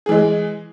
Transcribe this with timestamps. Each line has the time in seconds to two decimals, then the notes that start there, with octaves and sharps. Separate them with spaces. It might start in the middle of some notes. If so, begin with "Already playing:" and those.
0.06 G#4
0.09 E3
0.12 G#3